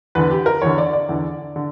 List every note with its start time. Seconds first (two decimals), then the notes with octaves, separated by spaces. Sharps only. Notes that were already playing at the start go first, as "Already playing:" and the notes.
0.15 E2 D3 B4
0.31 G4
0.46 A#4
0.62 E2 D3 C#5
0.78 D5
0.93 D5
1.09 E2 D3
1.56 D3